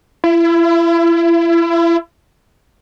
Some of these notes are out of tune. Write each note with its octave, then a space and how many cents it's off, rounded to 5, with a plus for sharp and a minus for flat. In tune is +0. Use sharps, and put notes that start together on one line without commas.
E4 +35